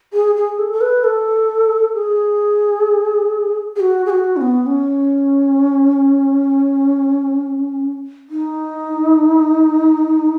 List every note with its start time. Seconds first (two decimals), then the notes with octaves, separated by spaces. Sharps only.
0.13 G#4
0.35 G#4
0.59 A4
0.73 A4
0.81 B4
1.04 A4
1.94 G#4
3.76 G#4
3.80 F#4
4.06 G#4
4.10 F#4
4.36 C#4
4.41 B3
4.66 C#4
8.30 D#4